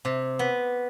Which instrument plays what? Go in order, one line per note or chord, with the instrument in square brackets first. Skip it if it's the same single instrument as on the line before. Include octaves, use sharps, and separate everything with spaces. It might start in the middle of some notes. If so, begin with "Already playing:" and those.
[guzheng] C3
B3